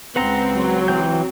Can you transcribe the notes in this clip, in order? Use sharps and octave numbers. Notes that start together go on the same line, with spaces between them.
C#2 C4 B4 F#5 A#5
F#3
E3 C4 G5 G6